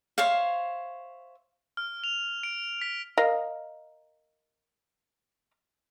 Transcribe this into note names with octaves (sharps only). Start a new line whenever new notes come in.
C5 C#5 E5 F5
F6
F7
D7
B6
A#4 D#5 F5